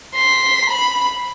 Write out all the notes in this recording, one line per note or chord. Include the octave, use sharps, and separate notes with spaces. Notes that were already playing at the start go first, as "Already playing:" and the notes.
C6 B6
B5